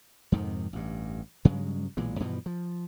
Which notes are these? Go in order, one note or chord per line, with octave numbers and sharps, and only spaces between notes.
F2 G#2 C3 D#3
A1 G2
G2 C#3 F#3 G#3
B1 A#2 E3 G#3
G2 B2 E3 F3
F3